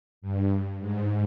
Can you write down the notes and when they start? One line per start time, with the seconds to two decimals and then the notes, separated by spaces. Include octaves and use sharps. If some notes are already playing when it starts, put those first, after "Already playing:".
0.22 G2
0.80 G#2